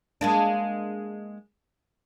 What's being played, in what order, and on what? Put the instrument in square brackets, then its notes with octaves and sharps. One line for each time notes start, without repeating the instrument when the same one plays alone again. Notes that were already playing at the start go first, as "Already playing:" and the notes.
[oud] G#3 A#3 D4